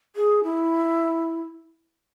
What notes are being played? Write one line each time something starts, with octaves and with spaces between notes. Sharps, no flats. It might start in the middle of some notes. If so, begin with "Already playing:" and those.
G#4
E4